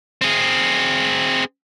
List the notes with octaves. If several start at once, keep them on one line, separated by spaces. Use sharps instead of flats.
C4 G#4